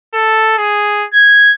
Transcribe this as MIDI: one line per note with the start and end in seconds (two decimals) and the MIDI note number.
0.14 0.58 69
0.58 1.05 68
1.13 1.52 92